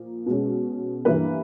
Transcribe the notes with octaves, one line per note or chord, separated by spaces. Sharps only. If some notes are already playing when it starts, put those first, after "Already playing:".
Already playing: A#2 F3 A#3
B2 G#3 C#4
G2 E3 G3 A#3 D4 B4